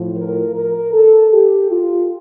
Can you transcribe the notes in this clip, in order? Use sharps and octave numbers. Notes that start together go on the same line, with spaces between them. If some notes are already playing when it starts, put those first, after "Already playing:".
Already playing: A2 F3
A#4
A#4
A4
G4
F4